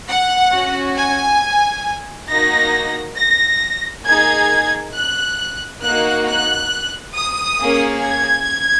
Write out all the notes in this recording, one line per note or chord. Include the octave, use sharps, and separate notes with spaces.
F#5
C#4 F#4
G#5
A#3 D#4 F#4 A#6
A#6
A#3 D#4 G#4 G#6
F#6
A#3 D#4 F#4 F#6
F#6
D#6
A#3 C#4 G#4
G#6